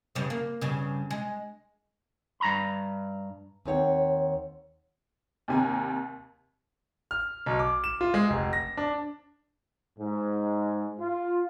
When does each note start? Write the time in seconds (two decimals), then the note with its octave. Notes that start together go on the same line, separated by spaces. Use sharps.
0.15 G2 C#3
0.30 A#3
0.61 G2 C#3
1.11 G#3
2.40 G2 A#5 B5
3.65 D#2 C4 C#5 F#5
5.48 D#2 C3 G#5 A#5
7.11 F6
7.46 B1
7.59 D6
7.84 E7
8.01 F4
8.14 G#3
8.30 F1
8.53 A#6
8.77 D4
9.99 G#2
11.00 F4